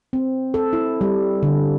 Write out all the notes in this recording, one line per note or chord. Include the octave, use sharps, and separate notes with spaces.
C4
A4
E4
G3
D3